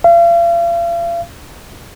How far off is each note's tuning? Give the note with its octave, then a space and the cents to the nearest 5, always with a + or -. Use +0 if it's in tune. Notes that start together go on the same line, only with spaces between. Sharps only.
F5 -40